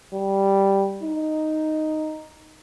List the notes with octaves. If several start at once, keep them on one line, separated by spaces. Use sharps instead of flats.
G3
D#4